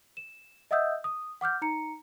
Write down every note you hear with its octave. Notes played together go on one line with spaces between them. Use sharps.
E7
D#5 E5 F#5 D#6 E6 G6
D#6
F#5 D6 F6 G6
D#4 A#5 C#7